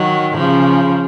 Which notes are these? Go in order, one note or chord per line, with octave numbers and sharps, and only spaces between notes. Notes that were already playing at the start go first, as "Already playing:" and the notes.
Already playing: D#3 F#3
C#3 F3